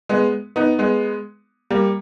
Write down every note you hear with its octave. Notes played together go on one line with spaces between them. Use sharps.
G#3 B3
B3 D#4
G#3 B3
G3 A#3